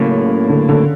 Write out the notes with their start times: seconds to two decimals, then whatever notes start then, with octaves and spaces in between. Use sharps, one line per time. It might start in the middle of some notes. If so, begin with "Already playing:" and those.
Already playing: A2 C#3 F#3 A#3
0.49 D3
0.69 D3